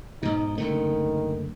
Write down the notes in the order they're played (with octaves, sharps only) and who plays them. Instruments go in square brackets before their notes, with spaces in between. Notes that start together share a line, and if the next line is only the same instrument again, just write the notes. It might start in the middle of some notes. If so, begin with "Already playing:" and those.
[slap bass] G#2 B2 [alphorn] D#4
[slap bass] F#1 D3 A3 [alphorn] D#3